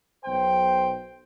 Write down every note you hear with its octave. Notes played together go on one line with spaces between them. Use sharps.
B1 C5 G5